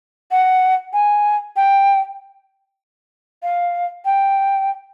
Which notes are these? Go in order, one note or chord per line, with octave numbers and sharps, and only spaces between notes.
F#5
G#5
G5
F5
G5